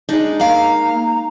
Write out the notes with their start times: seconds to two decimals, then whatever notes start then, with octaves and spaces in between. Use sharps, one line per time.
0.09 G#3 D4 D#4
0.40 A#3 F5 A#5